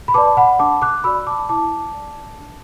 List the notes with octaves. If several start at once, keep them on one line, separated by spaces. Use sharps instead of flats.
B5
B4 D5 A5 D6
F#5 B5
D4 A5 D6
D6 F#6
F#4 D5 B5 E6
A5 D6
E4 A5 D6
D5
D4